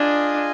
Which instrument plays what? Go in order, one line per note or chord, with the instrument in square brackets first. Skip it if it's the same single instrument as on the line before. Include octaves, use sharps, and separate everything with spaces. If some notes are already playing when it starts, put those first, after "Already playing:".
Already playing: [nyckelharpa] D4 [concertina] F4 G#4 D#5 G#5